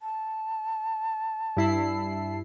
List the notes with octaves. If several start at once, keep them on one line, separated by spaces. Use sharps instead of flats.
A5
G2 E4 C7